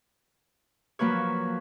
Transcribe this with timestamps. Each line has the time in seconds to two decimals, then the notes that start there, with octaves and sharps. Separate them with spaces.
0.99 F3 F#3 A#3 B4 C#5